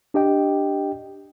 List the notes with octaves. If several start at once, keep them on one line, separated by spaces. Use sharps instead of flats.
D4 G4 D#5 G5